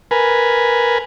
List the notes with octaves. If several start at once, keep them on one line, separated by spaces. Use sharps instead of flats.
A#4 B4 G#5